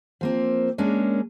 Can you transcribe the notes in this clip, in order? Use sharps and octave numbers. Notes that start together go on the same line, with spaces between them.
F3 A#3 C4
G#3 A#3 C#4 D4